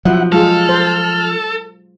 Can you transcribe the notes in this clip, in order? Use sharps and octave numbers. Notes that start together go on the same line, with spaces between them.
F3 F#3 E4 F#5
G#3 F4 G#4 A4 F6
C5